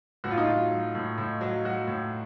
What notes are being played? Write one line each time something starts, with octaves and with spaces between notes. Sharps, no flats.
A2 F#4
F4
D#4
F#3 F4
F#3
A2
A2
F#3
F#3 F#4
A2